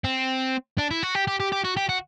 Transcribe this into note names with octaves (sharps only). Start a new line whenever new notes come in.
C4
D4
E4
F#4
G4
G4
G4
G4
F#4
G4
F#4